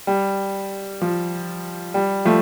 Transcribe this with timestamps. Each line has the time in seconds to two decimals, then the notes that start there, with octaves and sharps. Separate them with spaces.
0.07 G3
1.01 F3
1.94 G3
2.25 F3 A3